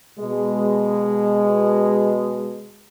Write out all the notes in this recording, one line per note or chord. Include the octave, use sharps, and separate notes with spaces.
B2 G#3